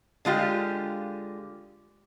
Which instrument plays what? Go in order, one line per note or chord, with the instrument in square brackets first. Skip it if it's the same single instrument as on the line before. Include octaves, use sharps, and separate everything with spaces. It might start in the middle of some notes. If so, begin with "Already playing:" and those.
[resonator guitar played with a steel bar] D3 G#3 F4 G4